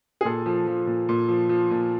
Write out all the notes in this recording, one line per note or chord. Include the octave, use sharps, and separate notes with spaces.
G#4
A#2 A4
F3
F3
A#2
A#2
F3
F3
A#2